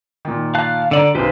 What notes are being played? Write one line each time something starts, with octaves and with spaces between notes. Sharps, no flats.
A#2 D#3
F5 A5 F#6
D3 D5 A#5 E6
B1 F#2 D#3 G4 B4 C5